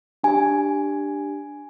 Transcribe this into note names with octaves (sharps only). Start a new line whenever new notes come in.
D4 G4 G#5